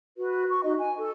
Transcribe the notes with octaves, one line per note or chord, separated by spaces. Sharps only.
F#4 B4
C#6
D#4 F#4 D#5
G#5
A4